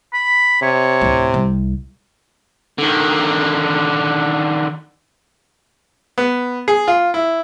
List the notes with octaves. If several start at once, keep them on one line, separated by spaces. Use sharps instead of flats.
B5
C3 C#5
D2 A2
C2
D3 D#3
B3
G#4
F4
E4